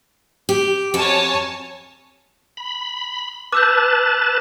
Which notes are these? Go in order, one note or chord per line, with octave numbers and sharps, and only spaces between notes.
G4
F2 F#4 C#5 G#5 A5
B5
B4 A5 D6 E6 G6